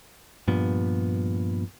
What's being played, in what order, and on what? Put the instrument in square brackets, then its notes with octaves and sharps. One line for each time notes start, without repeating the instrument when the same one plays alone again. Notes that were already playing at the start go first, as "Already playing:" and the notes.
[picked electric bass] G2 A#2 F3 B3